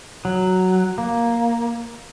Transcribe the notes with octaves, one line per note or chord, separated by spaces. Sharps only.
F#3
A#3